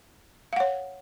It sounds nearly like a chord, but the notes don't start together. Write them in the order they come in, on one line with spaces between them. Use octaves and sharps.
F5 F#5 C#5